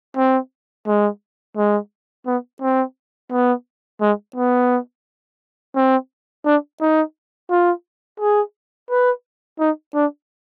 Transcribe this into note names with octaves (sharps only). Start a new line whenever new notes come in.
C4
G#3
G#3
B3
C4
B3
G#3
B3
C4
D4
D#4
F4
G#4
B4
D#4
D4